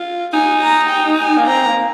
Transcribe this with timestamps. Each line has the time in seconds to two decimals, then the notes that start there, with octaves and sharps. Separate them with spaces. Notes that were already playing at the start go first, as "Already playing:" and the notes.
Already playing: F4
0.33 D#4 G#5
0.61 A#5
0.89 G5
1.19 G#5
1.38 A#3
1.47 C4 A#5
1.66 A#3